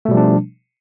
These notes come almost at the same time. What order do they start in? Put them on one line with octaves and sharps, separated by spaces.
A3 B2 G3 F3 D4